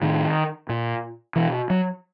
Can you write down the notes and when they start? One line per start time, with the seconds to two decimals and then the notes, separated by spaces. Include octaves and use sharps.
0.02 A2 D#3
0.69 A#2
1.36 B2 E3
1.70 F#3